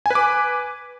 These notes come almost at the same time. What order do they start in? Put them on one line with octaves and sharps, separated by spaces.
G#5 B4 D6